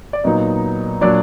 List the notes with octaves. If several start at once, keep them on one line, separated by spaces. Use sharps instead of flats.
D5
A#2 F#3 B3 D#4 D#5
A#2 F#3 D4 D5